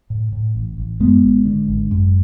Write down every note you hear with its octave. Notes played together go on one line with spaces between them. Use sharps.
A2
A2
A1
A1
F#2 G#3 B3
G#1
D3
G#1
F#2